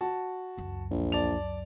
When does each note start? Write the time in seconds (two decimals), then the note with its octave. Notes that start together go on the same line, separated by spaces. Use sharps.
0.01 F#4 A5
0.57 C#2 F#2
0.91 A#1
1.12 D5 A5 F7